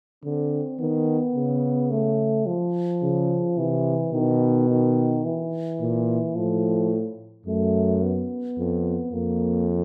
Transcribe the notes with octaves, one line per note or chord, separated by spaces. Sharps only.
D3 C4
D#3 B3
C#3
A3
F3
C#3
C3 E3
B2 D#3
D#3
E3
A#2
A2 F3
F#2 A3
B3
F2
F2 A#3